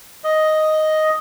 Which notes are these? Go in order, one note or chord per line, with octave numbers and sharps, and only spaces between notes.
D#5